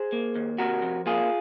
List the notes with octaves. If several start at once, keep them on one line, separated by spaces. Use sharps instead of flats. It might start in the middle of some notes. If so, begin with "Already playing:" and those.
Already playing: G#4 C5
A#3
D#2
C3 F#4 A#4
F2
A#3 F4 G#4